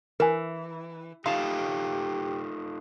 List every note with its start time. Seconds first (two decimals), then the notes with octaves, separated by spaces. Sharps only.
0.20 E3 A#4 G#5
1.26 D#4 F4 G4 A4 F5 A5 C6